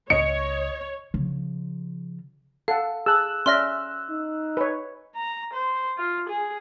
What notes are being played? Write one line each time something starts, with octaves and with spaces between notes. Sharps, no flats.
C#2 C#5 D#5 C#7
C#3 F3
A4 F5 F#5
G#4 A5 E6 F#6
C#4 D5 E5 C6 F6 A#6
D#4
B4 C#5
A#5
C5
F4
G#4